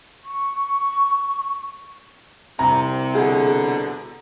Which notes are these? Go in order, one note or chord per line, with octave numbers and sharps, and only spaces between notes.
C#6
C2 C3 A#5
B2 D3 G#4